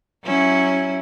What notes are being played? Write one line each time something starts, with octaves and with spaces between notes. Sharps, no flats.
F#3 C#4 E4